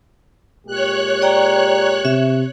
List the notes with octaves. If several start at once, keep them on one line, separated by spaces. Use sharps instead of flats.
A#2 G#3 G4 C#5 F#6
D5 G5 A#5
C3 E5